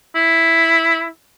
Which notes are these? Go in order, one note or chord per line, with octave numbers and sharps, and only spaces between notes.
E4